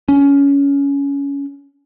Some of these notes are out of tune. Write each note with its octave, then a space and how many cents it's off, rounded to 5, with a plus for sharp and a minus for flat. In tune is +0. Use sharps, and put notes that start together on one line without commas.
C#4 +20